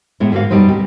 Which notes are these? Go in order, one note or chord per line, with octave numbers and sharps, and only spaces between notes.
A2 G#3 B3 E4
G#2 D3 A#3 F#4 F5
F#2 B2 G3 D#4 B4 C5
D2 G3 C4 G4